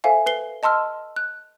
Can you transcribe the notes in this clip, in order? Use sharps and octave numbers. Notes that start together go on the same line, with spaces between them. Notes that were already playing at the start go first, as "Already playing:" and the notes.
A4 C5 E5 F5 G#5
B4 C7 G7
D#5 A5 C6 E6 F6
F#6